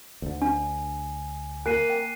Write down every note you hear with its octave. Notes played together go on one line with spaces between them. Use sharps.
D2 D3
D4 G#5
A#3 G#5 F#6 C7 D#7
G5